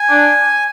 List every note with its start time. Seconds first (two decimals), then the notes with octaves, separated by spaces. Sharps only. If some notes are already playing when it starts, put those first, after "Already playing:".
Already playing: G#5
0.10 D4